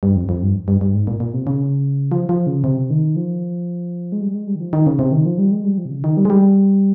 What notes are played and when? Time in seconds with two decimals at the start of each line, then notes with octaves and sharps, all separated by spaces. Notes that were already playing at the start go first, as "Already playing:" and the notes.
0.03 G2
0.16 F2
0.29 F2
0.42 G2
0.68 G2
0.81 G2
0.94 G#2
1.07 A#2
1.20 A#2
1.34 C3
1.47 C#3
2.12 F3
2.29 F3
2.47 C#3
2.64 C3
2.90 D#3
3.16 F3
4.12 G#3
4.21 G3
4.34 G#3
4.47 G3
4.55 D#3
4.60 F3
4.73 D#3
4.87 C#3
4.99 C3
5.12 D#3
5.26 F3
5.38 G3
5.52 G#3
5.64 G3
5.78 F3
5.85 C3
5.91 C#3
6.04 D#3
6.17 G3
6.25 G#3
6.30 G3